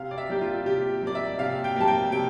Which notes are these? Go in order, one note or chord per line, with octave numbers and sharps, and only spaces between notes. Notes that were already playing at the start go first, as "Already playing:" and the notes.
Already playing: C3 F5
D5
E5
G3 A#3 G4
F4
C3 G4
G3 A#3 D5
E5
C3 F5
G5
G3 A#3 A5
G5
C3 G5